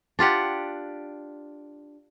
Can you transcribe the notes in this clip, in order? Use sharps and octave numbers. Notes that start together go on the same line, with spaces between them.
D4 F4 G4 F#5